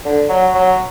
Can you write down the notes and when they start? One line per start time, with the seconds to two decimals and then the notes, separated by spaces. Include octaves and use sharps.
0.05 D3
0.29 F#3
0.55 F#3